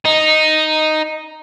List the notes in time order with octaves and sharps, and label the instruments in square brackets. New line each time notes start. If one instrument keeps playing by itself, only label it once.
[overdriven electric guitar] D#4